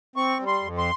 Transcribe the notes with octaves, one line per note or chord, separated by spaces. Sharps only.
C4 C#6
G3
C6
F2
C6